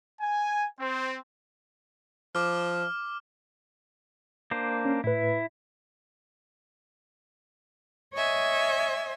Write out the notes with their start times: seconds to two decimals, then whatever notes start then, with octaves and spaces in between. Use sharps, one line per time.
0.21 G#5
0.80 C4
2.35 F3 D6 F6
4.51 A#3 D4 C5
4.85 C#4
5.04 A2 E4 B4
8.14 C#5 D#5 E5 G#5